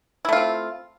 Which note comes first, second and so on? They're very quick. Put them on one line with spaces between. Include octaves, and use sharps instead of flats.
E4 A3 F4 C4